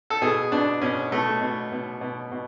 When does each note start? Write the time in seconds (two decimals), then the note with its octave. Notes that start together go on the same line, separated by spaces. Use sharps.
0.10 A4
0.22 B2 G#4
0.52 B2 D4
0.82 B2 C#4
1.12 B2 A3
1.41 B2
1.72 B2
2.01 B2
2.31 B2